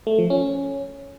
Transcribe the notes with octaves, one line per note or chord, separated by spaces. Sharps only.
A3
F3
C#4